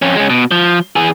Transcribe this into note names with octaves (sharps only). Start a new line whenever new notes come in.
F2 C#4
G#3 C#4
B2
F3
E3 G#4